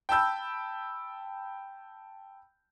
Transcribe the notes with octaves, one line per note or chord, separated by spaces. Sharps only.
G5 A5 B5 E6 G6